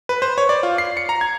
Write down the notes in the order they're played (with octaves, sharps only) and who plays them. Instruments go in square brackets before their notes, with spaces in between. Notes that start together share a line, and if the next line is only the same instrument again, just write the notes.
[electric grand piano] B4
C5
C#5
D5
F4
C7
C#7
A#5
G#6